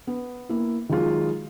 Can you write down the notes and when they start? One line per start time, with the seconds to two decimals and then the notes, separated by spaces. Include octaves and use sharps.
0.07 B3
0.49 A#3 E4
0.89 D#3 F#3 G#3 F4